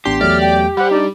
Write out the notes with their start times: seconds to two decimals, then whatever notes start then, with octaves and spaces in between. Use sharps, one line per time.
0.05 A1 B3 D4 G4 C6
0.21 E2 F#3 A3 D5 F6
0.41 G5
0.77 G3 C5 F#5 B5
0.91 D4 D#4 D5